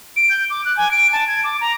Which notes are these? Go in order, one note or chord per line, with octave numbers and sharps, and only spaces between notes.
D7
G6
D6
F#6
G#5
D7
A5
G#6
D6
A#5